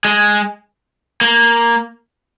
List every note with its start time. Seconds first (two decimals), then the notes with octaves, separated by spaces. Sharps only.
0.05 G#3
1.21 A#3